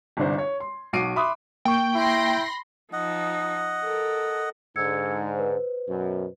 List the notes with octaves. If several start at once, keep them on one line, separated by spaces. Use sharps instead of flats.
G1 C2 D4 C5
C#5
C6
B1 F#4 D6 C7 D7 D#7
E5 B5 C6 D6 D#6 F#6
A#3 G5 C#6
E4 B5 C6 A#6
F3 D#4 D#5 F#5
A4 A#4
G#2 D3 E6 G#6 C#7
B4 C5
F#2 B2